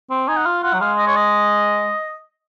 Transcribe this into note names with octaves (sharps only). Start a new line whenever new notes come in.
C4
D#4 G#5
F#5
F4 F5
F4 F#5
F#3
G#3 F5
D#5
C#5
D#5